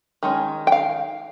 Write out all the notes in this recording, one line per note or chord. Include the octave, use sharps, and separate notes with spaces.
D#3 G#3 C#4
G5
F5